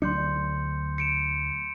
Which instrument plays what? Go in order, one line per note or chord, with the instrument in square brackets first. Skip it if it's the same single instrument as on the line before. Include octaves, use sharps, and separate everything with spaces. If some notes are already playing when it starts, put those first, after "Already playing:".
[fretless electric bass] D2 F#3 D4 [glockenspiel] C6 G6 C#7
[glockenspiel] C#7 D7 E7